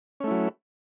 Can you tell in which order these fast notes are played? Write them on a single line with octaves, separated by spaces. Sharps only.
C#4 A3 E4 F#3